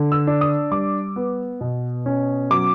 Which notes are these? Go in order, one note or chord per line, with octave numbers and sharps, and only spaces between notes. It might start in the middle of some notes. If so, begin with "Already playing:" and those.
Already playing: D3
E6
D4
D#6
G3 D6
B3
B2
C#4
F#3 D6